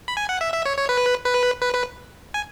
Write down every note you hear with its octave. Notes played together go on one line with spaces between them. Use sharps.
B5
G#5
F#5
E5
E5
C#5
C#5
B4
B4
B4
B4
G#5